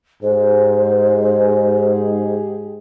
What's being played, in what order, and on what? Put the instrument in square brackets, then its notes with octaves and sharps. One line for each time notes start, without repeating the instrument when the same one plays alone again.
[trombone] G#2 [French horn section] G#3 G4 G#4 [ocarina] C5